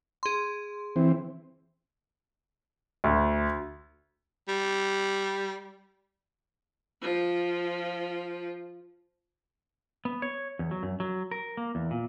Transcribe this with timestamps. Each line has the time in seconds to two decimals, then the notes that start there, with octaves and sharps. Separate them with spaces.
0.23 G#4 C6
0.96 E3 C4
3.04 D2
4.48 G3
7.02 F3 F4
10.05 B3
10.22 C#5
10.59 E2
10.71 F#3
10.83 F#2
11.00 F#3
11.31 A#4
11.57 A#3
11.75 E2
11.91 A#2